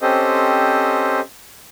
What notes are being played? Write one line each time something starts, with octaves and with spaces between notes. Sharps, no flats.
C4 C#4 G4 A4 C5 D#5